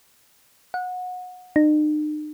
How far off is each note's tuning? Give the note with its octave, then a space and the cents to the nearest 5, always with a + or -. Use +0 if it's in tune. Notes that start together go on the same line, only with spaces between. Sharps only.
F#5 -25
D#4 -45